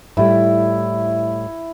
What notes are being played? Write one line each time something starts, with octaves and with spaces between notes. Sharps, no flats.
A2 G3 E4